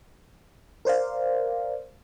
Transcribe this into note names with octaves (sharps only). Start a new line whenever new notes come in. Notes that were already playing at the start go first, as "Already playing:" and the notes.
A#4 C5 D5 F5